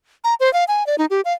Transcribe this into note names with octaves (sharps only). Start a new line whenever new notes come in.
A#5
C5
F5
G#5
D5
D#4
G4
F5